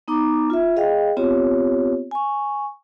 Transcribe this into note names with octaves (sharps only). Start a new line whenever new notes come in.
B3 D#4 A#5 D6
F4 E5
G#4 D#5 F5 G5
B3 C4 F4 G4 C#5
G#5 C#6